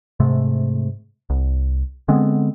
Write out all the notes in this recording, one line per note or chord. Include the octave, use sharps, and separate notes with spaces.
G#2 C3 A3
C2
D3 G#3 B3 C4